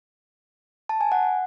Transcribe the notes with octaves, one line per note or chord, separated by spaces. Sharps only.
A5
G#5
F#5